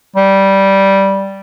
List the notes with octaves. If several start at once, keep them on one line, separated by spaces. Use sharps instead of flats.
G3